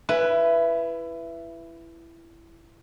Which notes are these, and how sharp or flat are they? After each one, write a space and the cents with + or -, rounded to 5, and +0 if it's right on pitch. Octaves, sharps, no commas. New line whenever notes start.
E4 +20 B4 +0